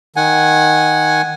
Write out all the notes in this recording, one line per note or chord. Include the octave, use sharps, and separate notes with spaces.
D#3 F#5 G#5